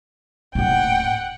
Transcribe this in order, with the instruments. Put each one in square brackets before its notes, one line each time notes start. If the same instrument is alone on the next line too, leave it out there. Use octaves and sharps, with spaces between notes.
[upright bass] D#1 A2 [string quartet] F#5 G5